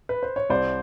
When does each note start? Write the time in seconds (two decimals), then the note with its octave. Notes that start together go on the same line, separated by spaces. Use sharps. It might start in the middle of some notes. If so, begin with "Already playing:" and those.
0.09 B4
0.23 C5
0.36 C#5
0.49 C2 C5 D5